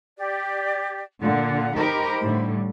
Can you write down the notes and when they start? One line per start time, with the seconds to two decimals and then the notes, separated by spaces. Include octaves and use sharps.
0.18 G4 D5
1.21 A#2 D3 F4 F#5
1.76 D#4 G4 A#4 C5 B5
2.23 A2 D3 G3